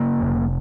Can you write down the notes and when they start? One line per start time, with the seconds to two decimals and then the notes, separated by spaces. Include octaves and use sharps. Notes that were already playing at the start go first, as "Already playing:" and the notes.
Already playing: C#3 A#3
0.21 F1